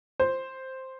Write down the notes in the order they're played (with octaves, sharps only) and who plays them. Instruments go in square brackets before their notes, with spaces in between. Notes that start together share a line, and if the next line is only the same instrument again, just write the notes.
[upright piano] C5